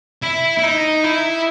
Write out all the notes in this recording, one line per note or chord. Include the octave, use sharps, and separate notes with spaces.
E4
E4
D#4
E4